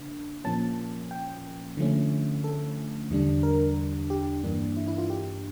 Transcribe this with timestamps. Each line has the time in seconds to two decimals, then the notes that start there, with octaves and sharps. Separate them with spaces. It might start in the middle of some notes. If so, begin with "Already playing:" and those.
Already playing: C#3 A#3 D4
0.44 A#2 F3 A#3 C#4 A5
1.11 G5
1.77 D3 F3 A3 C#4
2.44 A4
3.10 E2 D3 G3 D4
3.43 A#4
4.10 G4
4.44 G2 E3 A#3 D4
4.77 E4
4.88 E4
4.98 F4
5.10 G4